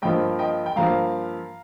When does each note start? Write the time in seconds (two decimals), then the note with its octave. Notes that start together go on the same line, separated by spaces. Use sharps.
0.02 G2 F3 A#3 D#5 G5
0.39 D#5 G5
0.66 G5
0.76 G2 F3 A#3 F5 A#5